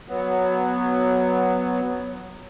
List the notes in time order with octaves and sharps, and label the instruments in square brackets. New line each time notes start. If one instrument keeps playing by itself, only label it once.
[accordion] F#3 B3